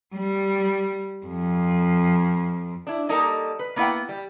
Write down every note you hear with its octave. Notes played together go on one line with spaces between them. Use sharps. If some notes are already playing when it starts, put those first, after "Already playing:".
G3
F2
D4 E4
G3 A#3 D#4 A4 A#4 D#5
B4
A#3 B3 E4 D5 F#5 G5
G3